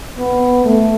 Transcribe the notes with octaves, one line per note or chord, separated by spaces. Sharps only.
B3
A3